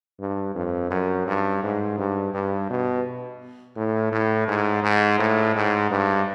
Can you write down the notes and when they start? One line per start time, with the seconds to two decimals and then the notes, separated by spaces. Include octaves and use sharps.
0.20 G2
0.55 F2
0.91 F#2
1.27 G2
1.63 G#2
1.98 G2
2.34 G2
2.70 B2
3.76 A2
4.12 A2
4.48 G#2
4.83 G#2
5.19 A2
5.56 G#2
5.90 G2